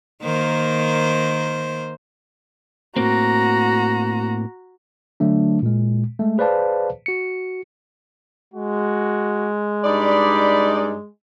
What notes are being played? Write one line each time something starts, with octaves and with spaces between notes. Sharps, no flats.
D#3 A#3 C5
A2 A#3 C4 F#4 A#5
D3 F#3 A3 D4
A#2 G#3
G#3 A3
G#4 B4 C5 D5 F5 A5
F#4 C#7
G#3 F#4
G2 D#4 D5 B5